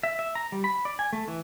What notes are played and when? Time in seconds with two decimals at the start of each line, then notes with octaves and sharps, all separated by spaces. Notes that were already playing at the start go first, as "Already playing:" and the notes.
0.03 E5
0.19 E5
0.35 A#5
0.52 G3
0.64 B5
0.85 D5
0.99 G#5
1.13 A3
1.28 E3